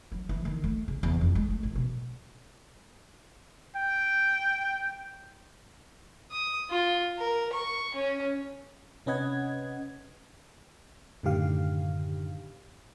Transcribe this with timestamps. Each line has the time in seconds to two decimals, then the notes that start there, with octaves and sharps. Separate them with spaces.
0.12 F#3
0.29 E3
0.45 D#3
0.64 A3
0.88 C#3
1.03 E2
1.21 F2
1.35 G#3
1.50 A3
1.63 A1
1.76 B2
3.76 G5
6.31 D#6
6.70 F4
7.18 A#4
7.53 C#6
7.94 C#4
9.06 C3 C#4 B4 D#5 F#5 G#6
11.23 F#2 A2 D3 D#3 G4 F5